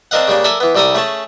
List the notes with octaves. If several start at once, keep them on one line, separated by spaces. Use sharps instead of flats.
C4 D4 A#4 D#5 F5 F#5
C#3 G3 A#3 D4
A4 A#4 D5 E5 G#5
E3 B3
C2 G3 A4 A#4 D5 D#6
A3 C#4 G#4 A5